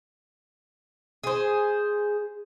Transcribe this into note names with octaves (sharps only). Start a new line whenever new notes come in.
G#4 C5